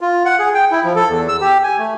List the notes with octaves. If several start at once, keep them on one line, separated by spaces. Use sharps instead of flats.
F4
F#5
G#4
G5
E4
F3
A4
E2
E6
G4
G#5
A3